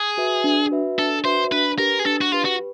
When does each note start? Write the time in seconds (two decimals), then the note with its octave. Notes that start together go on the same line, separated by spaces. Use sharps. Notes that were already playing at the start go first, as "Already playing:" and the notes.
Already playing: G#4
0.17 F#4 B4 E5
0.44 D4
0.71 F#4 B4 E5
0.99 D4 A4
1.25 F#4 B4 C5 E5
1.52 D4 B4
1.78 G4 A#4 B4
1.99 G#4
2.05 D4 A4
2.21 F#4
2.32 F4 G4 B4
2.45 F#4